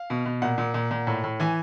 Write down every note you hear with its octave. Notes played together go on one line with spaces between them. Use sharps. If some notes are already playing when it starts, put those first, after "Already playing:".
Already playing: F5
B2
B2
A#2 F#5
A#2
A#2
A#2
A2
A2
E3 G#5